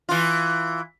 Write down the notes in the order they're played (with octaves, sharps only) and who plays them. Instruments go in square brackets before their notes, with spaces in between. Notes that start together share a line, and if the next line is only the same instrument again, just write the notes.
[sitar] E3 F4